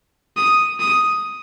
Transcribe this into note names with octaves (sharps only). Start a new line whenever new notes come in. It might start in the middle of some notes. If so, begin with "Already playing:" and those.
D#6
D#6